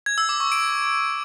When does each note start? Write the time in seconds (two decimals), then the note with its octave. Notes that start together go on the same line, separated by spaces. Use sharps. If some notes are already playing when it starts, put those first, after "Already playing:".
0.06 G#6
0.18 E6
0.29 D6
0.40 C#6
0.52 D7